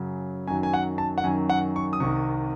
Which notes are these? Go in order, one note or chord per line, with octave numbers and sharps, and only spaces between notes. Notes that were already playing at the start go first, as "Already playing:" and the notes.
Already playing: F#2 C#3 F#3
F#2 D#3 F#3 G#5
G#5
F#5
A5
F#5
F#2 D#3 F#3 G#5
F#5
C#6
D#6
C2 C3 D#3 C#6